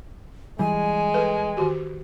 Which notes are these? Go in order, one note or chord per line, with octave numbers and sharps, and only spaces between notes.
E3 G3 G#3 G#5
A4 B4
D#3 F#4 G4